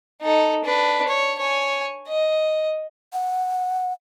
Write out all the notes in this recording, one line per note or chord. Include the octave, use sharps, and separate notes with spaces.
D#4 A4
D4 B4
C#5
C#5 G#5
D#5
F#5